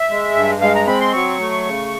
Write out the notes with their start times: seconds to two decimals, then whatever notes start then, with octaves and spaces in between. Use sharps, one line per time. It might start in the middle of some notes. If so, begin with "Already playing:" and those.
Already playing: E5
0.10 G#3
0.35 G2
0.61 G#3 F5
0.75 A#5
0.87 C4 B5
1.00 C6
1.13 F#3 C#6
1.40 A3
1.66 C#3